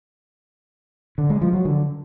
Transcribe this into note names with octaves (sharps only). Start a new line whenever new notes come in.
D3
G#3
F3
F#3
D3